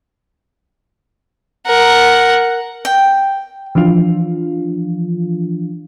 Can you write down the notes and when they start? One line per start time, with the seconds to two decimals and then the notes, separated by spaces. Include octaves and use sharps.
1.66 A#4 F#5
2.85 G5
3.75 E3 F3 D4 F4